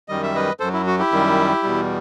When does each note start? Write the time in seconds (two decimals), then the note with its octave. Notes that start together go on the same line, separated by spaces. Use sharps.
0.08 F#2 D#3 G3 D#5
0.23 E5
0.35 B4 D#5
0.60 F#2 F#3 A4 C5
0.73 E4
0.87 F#4
0.99 E4 G4
1.11 F#2 D#3 G3
1.63 E2 B2 G3